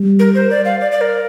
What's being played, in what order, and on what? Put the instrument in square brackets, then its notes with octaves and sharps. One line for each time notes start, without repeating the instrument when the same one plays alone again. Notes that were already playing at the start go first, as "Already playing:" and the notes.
Already playing: [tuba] G3
[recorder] A#4
C5
D5
F5
D5
D5
A#4